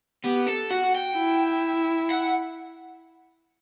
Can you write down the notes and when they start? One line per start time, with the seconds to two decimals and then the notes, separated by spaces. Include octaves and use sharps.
0.25 B3 G4
0.47 A4
0.71 F#4 F#5
0.95 G5
1.17 E4
2.11 F#5